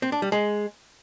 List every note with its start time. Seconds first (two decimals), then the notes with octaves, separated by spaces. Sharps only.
0.02 C4
0.12 D4
0.22 G3
0.32 G#3